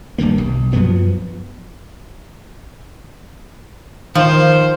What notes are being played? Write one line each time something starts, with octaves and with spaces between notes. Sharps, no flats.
D1 G2 D#3 A#3
B1
F#2 F3 F#3 B3
D#3 F3 C5